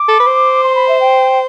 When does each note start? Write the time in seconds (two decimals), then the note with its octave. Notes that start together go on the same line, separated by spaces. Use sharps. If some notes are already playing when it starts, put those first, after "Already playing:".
Already playing: D6
0.08 A4
0.20 B4
0.26 C5
0.64 C6
0.75 B5
0.89 E5
1.00 G5